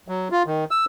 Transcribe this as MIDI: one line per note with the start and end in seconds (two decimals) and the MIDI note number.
0.08 0.28 54
0.32 0.43 65
0.46 0.64 51
0.71 0.85 88